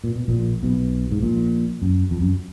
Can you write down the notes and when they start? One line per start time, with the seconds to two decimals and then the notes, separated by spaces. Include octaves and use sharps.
0.04 A#2
0.16 B2
0.28 A#1 A#2
0.63 B1 B2
1.11 G#2
1.22 A#1 A#2
1.82 F#2
2.11 F2
2.21 F#2